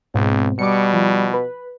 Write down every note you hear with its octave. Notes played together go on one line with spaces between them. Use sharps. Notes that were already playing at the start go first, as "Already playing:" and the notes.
C#2 G#2 B2 C4
B2 G3 D6 C#7
F3
B4